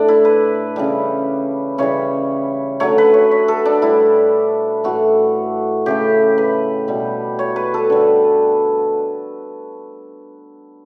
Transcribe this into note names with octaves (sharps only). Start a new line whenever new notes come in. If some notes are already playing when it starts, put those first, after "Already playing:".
Already playing: A2 A3 D4
E4
B4
C#3 E3 G3
C#3 E3 G3 C#5
D3 F#3 A3 C#5
B4
C#5
C#5
A4
D4
A2 G3 E4
A2 E3 A3 F#4
C#3 E3 A3 G4
B4
B2 G3
C#5
B4
A4
D3 G3